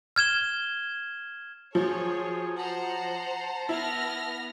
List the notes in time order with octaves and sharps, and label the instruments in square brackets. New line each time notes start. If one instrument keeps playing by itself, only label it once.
[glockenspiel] F6 G#6 E7 G7
[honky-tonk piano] F3 F#3 [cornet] G#4 [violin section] C#5
[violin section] C5 F#5 A#5 [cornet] A5
[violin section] B3 F6 A#6 [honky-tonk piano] E4